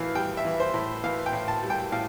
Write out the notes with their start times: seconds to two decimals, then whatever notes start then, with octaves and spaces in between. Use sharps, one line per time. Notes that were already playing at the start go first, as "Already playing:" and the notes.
Already playing: A2 E3 F5
0.15 G3 G5
0.37 E5
0.45 E3
0.60 C5
0.74 A2
1.04 E3 F5
1.26 G5
1.33 A2
1.48 A5
1.63 G3
1.70 G5
1.92 A2 F5